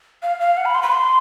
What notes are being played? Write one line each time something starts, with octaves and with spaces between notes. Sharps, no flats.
F5
F5
F#5
B5
C6
B5
C6